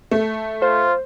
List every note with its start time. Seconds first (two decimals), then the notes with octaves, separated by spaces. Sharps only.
0.11 A3
0.62 F4 C5